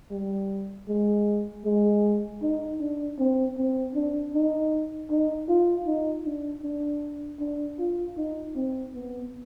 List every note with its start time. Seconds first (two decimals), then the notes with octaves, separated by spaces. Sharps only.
0.11 G3
0.88 G#3
1.65 G#3
2.42 D#4
2.80 D4
3.18 C4
3.57 C4
3.95 D4
4.34 D#4
5.11 D#4
5.49 F4
5.87 D#4
6.26 D4
6.63 D4
7.40 D4
7.79 F4
8.17 D#4
8.56 C4
8.94 B3